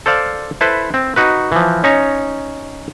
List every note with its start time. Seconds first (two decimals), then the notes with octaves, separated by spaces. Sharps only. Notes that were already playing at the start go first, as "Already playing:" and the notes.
0.06 A4 C5 D5 F5
0.61 E4 A4 B4 C5
0.94 C4
1.16 D#4 F#4 B4
1.52 E3 F3
1.84 C#4 D#4 C#5 A#5